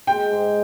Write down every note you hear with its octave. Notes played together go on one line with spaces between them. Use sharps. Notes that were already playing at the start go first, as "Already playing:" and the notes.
G#3 G5
G#2